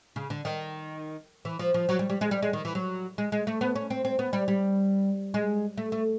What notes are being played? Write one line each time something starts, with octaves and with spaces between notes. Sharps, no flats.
C#3
D3
D#3
E3
F3
F3
F#3
G3
G3
G#3
G3
G#3
D#3
E3
F#3
G#3
G#3
A3
B3
C#4
C4
C4
B3
G3
G3
G#3
A3
A3